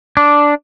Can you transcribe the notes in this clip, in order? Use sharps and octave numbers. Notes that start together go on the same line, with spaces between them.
D4